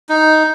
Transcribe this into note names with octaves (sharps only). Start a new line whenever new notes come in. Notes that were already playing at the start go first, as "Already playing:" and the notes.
D#4